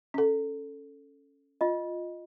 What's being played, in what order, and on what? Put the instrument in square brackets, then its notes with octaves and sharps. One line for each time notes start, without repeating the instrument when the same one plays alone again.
[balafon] C#4 A4
[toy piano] F4 D#5